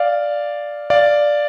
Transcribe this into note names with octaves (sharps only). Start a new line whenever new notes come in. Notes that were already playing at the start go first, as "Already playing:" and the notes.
Already playing: D5 F5
D5 F5